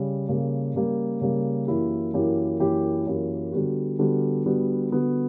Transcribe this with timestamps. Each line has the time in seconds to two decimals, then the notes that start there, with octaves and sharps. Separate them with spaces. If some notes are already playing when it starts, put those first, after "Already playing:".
Already playing: C#3 G3
0.29 C#3 G3 A#3
0.75 C#3 G3 A#3
1.21 C#3 G3 A#3
1.67 F#2 E3 A#3 E4 G4
2.13 F#2 E3 A#3 E4 G4
2.60 F#2 E3 A#3 E4 G4
3.07 F#2 E3 A#3 E4 G4
3.52 D3 G3 B3 F#4
3.99 D3 G3 B3 F#4
4.45 D3 G3 B3 F#4
4.91 D3 G3 B3 F#4